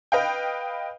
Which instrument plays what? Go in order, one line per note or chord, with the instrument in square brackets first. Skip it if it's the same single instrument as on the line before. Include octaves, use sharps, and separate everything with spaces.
[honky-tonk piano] B4 D#5 F5 G5